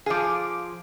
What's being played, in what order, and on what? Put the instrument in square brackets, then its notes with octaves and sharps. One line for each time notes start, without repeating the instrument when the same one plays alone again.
[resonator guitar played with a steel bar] F3 G#4 [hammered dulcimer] F5 D6